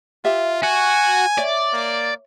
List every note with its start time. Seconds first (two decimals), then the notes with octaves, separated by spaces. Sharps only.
0.24 F4 G4 E5
0.63 F#4 G#5
1.38 C#5 D5 E5
1.73 A#3